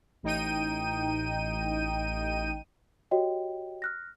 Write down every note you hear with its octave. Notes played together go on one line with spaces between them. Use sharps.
A1 D#4 G5 D#7
F#4 G4 C#5 D#5 G5
F6 F#6 A#6